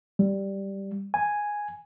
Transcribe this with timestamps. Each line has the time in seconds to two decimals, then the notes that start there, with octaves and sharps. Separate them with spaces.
0.19 G3
1.14 G#5